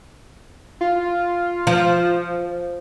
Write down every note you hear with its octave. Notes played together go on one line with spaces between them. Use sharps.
F4
F3